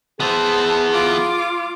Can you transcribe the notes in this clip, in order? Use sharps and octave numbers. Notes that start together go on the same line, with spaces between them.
E3 B3 G#4 C5 A5
F4 D6